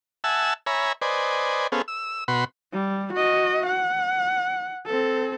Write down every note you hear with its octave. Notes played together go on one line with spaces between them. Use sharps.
E5 F#5 G#5 A5 E6
C#5 E5 G#5 A#5 B5
B4 C5 D5 D#5 G#5
B3 C#4 G#4 A4 C5 F5
E6
B2 F#4 B5 C6
G3
F#4 D#5
F#5
C4 A4